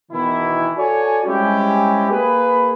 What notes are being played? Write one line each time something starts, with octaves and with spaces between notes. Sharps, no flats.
B2 D#3 E3 E4
F#4 A4 C#5 D5 G#5
G3 G#3 C4 C#4 E4 G4
A#3 G#4 B4